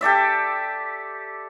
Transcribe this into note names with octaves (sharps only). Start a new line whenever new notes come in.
G4 A4 D5 E5